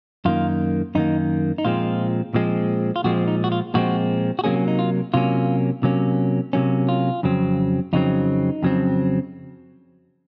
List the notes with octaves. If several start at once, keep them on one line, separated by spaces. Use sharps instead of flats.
F#2 D#3 A#3 F4
F#2 D#3 A#3 D#4
D#4
A#2 F3 G#3 C4 F4
A#2 F3 G#3 C4
F4
A#2 F3 G#3 C4 F#4
D#4
F#4
F4
A#2 F3 G#3 C4 F#4
F#4
C3 F#3 A#3 C#4 G#4
D#4
F4
C3 F#3 A#3 C#4 F4
C3 F#3 A#3 C#4
C3 F#3 A#3 C#4
F4
F2 C#3 F#3 C4
F2 C#3 F#3 C4 D#4
F2 C#3 F#3 C4